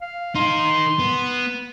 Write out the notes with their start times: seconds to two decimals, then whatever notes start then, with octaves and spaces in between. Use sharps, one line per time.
0.01 F5
0.35 D#4 A#4 C6
0.99 B3